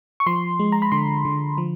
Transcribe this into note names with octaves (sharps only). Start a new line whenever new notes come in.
C#6
F3 C6
G#3
A#5
B5
D3 C6
D3
F3